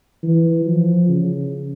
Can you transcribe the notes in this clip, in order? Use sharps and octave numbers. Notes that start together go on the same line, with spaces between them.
E3
F3
C#3